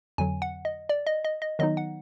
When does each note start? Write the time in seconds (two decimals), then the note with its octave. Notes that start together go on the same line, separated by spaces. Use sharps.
0.18 F2 D3 F#3 G#5
0.42 F#5
0.65 D#5
0.89 D5
1.07 D#5
1.25 D#5
1.42 D#5
1.59 D#3 F#3 B3 D#4 D#5
1.77 F#5